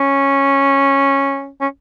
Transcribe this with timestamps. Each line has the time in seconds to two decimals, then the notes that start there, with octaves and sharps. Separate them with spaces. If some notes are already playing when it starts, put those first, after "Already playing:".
Already playing: C#4
1.61 C#4